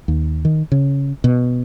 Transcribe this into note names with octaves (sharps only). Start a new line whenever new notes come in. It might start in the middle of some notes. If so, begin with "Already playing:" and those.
D#2
D#3
C#3
B2